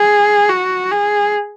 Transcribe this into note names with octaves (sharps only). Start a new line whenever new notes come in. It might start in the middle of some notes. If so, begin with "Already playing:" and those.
Already playing: G#4
F#4
G#4